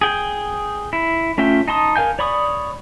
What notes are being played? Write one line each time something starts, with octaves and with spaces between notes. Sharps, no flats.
G#4 G5
E4
A3 C#4 F4 E5 G5
D#4 A5 C6 D#6
A#4 F5 G#5 G6
C#5 D5 B5 C#6 D#6